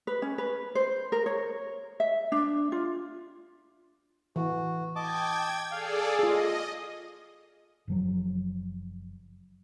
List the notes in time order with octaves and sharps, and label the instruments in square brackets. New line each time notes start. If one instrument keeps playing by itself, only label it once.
[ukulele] B4
C#4
B4
C5
A#4
C#5
E5
D4
F4
[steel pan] E3 [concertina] F#4
[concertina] D#5 A5 D6 [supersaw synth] G5 G#6
[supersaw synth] G#4 A4 D5 [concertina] F5
[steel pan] F4 G#4 [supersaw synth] D#5
[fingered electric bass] F#1 F3 F#3